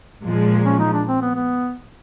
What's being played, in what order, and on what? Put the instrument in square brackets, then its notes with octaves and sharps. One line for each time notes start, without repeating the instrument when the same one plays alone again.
[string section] A#2 F3 G#3
[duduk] C#4
D#4
D4
C4
B3
B3